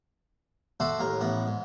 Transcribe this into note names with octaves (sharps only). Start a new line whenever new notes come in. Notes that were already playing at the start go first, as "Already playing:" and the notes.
F#4 A4 C5 D5 E5
D#2 A2 A#4 A#5
A1 A2 B3
G#2